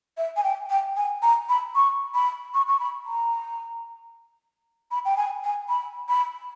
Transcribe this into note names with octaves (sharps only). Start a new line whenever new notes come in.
E5
G#5
G5
G5
G#5
A#5
B5
C#6
B5
C#6
C#6
B5
A#5
B5
G5
G#5
G#5
B5
B5